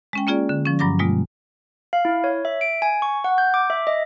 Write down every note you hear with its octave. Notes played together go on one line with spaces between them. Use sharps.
G#3 C#4 G5
A#3 C#4 F4 G#4 D5
D3
F3 C#4
G2 F#3 A#5 D6 A#6
B2 G3 G#3 A#3 F4
F5
E4
C#5
E5
D7
G#5
C#6
F#5
G6
D6
E5
D#5